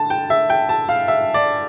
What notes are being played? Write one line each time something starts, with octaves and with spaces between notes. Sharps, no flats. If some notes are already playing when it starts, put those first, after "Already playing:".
Already playing: D3 A5
G5
E5
G5
A5
F5
E5
D5